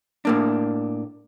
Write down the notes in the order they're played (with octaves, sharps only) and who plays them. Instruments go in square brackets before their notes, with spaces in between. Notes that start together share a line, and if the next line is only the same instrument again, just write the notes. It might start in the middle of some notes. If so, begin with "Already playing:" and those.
[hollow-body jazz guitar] A2 A#3 D4